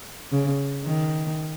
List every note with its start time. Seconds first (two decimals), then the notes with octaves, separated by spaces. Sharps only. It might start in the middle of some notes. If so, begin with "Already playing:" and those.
0.32 C#3
0.84 D#3